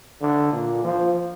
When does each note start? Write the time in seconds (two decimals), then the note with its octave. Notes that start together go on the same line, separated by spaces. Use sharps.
0.21 D3
0.52 A#2
0.84 F3